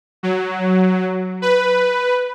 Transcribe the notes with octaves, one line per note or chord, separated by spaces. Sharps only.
F#3
B4